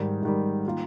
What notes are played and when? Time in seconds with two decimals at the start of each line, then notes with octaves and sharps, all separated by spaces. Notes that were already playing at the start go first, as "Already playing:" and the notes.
Already playing: G#2 D#3 G3
0.22 G#2 D#3 G3
0.66 D#3 A#3 F4